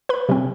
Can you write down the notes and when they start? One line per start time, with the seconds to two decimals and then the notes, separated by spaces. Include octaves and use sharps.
0.09 B4 B5
0.29 C3 F#3 C4